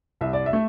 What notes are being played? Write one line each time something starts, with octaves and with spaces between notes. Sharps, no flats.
C2 E5
D5
E5
A3